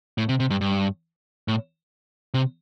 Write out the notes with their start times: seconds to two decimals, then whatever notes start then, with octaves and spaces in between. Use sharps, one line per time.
0.18 A2
0.29 C3
0.40 C3
0.50 G2
0.61 G2
1.48 A2
2.34 C3